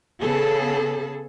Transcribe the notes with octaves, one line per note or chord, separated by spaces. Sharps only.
C#3 B3 G#4 A4